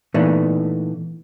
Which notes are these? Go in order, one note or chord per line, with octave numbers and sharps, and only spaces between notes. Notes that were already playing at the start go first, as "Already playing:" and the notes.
A#2 E3 A3 B3 D4 D#4